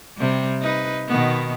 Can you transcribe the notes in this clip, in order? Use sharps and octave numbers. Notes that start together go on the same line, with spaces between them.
C3 G3
D#4 B4
B2 D#3 B3